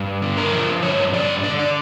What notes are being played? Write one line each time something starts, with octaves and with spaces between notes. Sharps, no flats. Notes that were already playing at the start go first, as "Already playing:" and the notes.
Already playing: G2
D3
A#4
F3
G2 C#5
D3 D5
D3 D5
D5